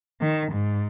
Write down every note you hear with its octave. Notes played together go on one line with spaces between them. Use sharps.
D#3
G#2